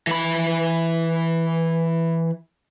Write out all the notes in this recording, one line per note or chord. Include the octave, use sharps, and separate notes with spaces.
E3 B5